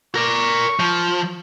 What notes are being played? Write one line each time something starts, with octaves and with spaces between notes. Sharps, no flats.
A#4 D5 C#6
F3